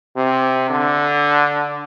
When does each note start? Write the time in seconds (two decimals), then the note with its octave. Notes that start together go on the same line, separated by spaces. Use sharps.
0.16 C3
0.70 D3